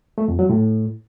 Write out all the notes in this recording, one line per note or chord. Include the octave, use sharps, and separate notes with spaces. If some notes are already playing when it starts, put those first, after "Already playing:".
A3
F2
F#3
A2